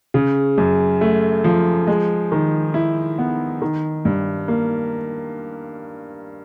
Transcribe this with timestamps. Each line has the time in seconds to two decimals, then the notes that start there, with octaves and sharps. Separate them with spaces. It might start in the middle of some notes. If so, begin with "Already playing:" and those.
0.14 C#3
0.58 F#2
1.01 A3
1.44 F3
1.87 G#3
2.32 D#3
2.74 E4
3.18 B3
3.62 D#3
4.05 G2
4.48 A#3